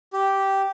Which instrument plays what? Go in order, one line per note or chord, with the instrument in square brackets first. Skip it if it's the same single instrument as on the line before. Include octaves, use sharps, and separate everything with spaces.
[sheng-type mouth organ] G4